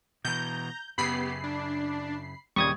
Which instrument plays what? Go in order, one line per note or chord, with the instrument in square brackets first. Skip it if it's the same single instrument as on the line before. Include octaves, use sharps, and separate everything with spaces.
[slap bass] B2 E3 [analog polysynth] A#5 [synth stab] G6
[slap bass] F#2 C#3 [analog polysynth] B3 G4 [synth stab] B5 C7
[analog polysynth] D4
[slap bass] D#2 [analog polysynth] A#2 C#3 C4 [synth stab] G3 [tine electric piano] C#6 D#6 G#6